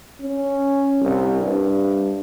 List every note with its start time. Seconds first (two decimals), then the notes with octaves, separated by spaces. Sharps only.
0.21 C#4
1.01 C2
1.40 G2